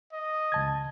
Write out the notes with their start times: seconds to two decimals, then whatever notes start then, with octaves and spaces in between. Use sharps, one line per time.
0.13 D#5
0.52 C#2 A5 G#6